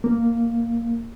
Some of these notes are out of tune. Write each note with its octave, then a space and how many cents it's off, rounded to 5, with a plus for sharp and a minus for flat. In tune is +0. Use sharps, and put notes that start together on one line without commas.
A#3 -5